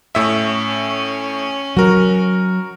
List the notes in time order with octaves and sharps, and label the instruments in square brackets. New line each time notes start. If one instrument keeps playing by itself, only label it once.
[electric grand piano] A2 E5 [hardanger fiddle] C#4
[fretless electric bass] F#3 [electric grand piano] F#4 A#4